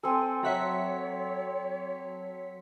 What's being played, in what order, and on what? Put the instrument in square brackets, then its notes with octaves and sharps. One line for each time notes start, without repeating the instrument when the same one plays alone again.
[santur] C4 A4 [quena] G#5
[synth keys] F#3 B6 C#7 [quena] C#5 [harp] E5 F#5 A#5